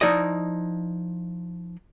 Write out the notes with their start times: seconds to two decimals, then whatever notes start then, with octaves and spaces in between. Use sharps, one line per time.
0.01 F3 D#4 E4 D5 D#5